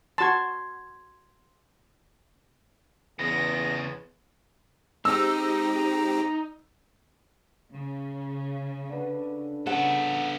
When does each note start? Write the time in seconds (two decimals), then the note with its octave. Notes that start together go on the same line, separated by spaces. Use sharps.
0.18 F#4 A5 C6 G#6
3.19 E2 C#3 B3 A#6
5.05 G#3 C4 D#4 G4 A#5 E6
7.74 C#3
8.89 D3 D4 B4
9.67 C#3 B3 A4 F#5